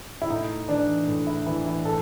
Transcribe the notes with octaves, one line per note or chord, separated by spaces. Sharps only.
E4
A2 D#4
E3 D4
A2
E4
E3 E4
E4
A2 A4